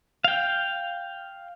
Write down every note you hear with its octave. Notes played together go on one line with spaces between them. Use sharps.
F5 G5